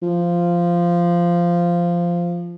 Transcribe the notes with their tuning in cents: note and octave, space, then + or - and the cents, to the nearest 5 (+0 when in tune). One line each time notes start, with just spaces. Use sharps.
F3 -10